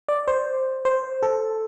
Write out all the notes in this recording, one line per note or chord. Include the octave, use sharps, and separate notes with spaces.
D5
C5
C5
A4